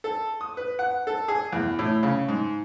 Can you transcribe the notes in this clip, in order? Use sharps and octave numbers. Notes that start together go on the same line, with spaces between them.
A4
D#6
B4
F#5
A4
G#4
E2
A2
C#3
G#2